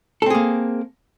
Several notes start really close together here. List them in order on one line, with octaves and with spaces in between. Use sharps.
A4 C4 G#4 A#3